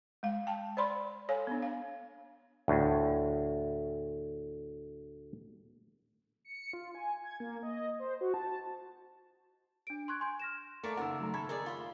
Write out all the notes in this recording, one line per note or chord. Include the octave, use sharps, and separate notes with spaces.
G#3 F5
G5 A5
C5 D5 B5 C6
A4 C#5 F5 G#5
B3 D4
F5
D2 A2
C#7
F4
G#5
G#6
A#3
D#5
C5
F#4
A5
D4 D7
C6 C#6 F#6 G#6
G#5 C6 G6
F6 A#6 E7
A3 A#3 A4 A#4 C#5 D5 A5
F#1 D#3 A#4 F#5 E6
F#3 A3 A#5
A4 B5 C#6 G#6
D#4 G#4 A#4 D5
F4 B5